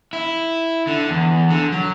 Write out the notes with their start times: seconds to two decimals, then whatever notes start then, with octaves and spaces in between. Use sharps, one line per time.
0.13 E4
0.87 D3
1.10 E2
1.50 D3
1.72 F#3